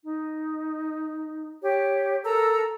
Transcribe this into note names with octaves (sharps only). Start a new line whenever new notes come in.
D#4
G4 C#5
A4 A#4 A#5 E6